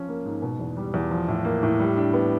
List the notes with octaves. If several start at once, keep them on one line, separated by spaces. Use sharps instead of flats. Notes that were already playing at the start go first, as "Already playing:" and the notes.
Already playing: F3 C#4
A#3
G#2
B2
E2
G3
E2
F3
A2
A#3
A2
G3
D4
B3